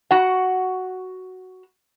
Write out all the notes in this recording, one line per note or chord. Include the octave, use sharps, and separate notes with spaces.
F#4 F#5